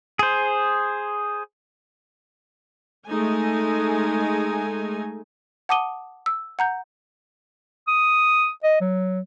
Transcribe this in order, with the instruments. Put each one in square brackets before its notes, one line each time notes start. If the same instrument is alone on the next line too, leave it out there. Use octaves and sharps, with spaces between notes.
[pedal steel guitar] G#4 C5
[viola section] G#3 A3 D#4 G#5
[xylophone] F#5 A5 D6 D#6 D#7 G7
E6
F#5 A#5 G6
[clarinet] D#6
D#5
F#3